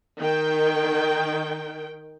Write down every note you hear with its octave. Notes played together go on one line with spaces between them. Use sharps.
D#3 G5